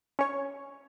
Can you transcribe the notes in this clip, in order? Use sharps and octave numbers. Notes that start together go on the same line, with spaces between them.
C#4 C#5